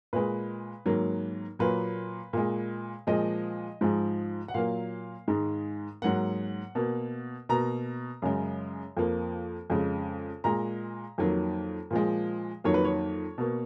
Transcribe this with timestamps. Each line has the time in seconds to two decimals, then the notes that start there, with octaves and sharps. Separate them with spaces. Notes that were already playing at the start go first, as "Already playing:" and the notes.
0.13 A#2 G#3 B4
0.86 G#2 D#3 F#3 A#3
1.59 A#2 F#3 A#3 B4
2.33 A#2 G#3
3.07 A#2 F3 G#3 D#5
3.81 G#2 F3 G#3
4.48 F#5
4.54 A#2 F#3 A#3 F5
5.28 G#2 D#3 G#3
6.02 G#2 F#3 A#3 F#5
6.75 B2 A#3
7.49 B2 A#3 A#5
8.22 F#2 C#3 G#3
8.97 F2 F3 A#3
9.70 F2 C#3 G#3
10.44 A#2 G#3 A#5
11.18 F2 D#3 F#3 A#3
11.91 A#2 F3 G#3
12.64 F2 D#3 F#3 A#3 C#5
12.74 B4
12.85 C#5
13.38 B2 A#3